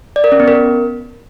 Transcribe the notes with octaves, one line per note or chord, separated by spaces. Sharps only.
D5
A#4
C#4
B3
A#4